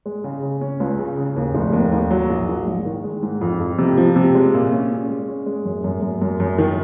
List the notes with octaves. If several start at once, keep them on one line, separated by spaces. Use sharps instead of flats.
G#3
C#3
C#3
C#4
C#2
C#3
C#3
D#2
F1
D#2
D#2
F#3
A#1
A#1
G#2
D#3
G#3
G#2
F2
F2
C3
F3
C3
G#3
A#2
C#4
C#4
G#3
C#4
G#3
F#2
F#2
F#2
F#2
F#2
D#3